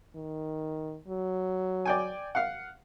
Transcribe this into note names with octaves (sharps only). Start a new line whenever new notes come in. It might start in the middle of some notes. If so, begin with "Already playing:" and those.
D#3
F#3
D5 G5 G#5
F5 F#5